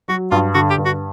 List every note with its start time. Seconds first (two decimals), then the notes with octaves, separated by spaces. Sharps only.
0.08 F#3 F#4
0.31 G2 F4
0.54 D3 F#4
0.70 G4
0.78 G2
0.85 F#4